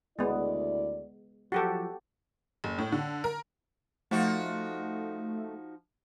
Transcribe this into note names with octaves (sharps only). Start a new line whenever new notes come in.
D2 G#3 B3 E4 D5
F3 F#3 F#4 G4 A4
F#1
A2
D3
A#4
F3 A3 D#4 F#4